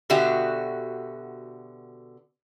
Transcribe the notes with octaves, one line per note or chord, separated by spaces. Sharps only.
B2 D3 F#4 G4 E5